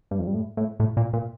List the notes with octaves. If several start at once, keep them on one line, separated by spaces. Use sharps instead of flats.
G2
F2
G2
A2
A2
A2
A#2
A#2